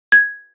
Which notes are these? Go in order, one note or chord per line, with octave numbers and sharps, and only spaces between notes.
G#6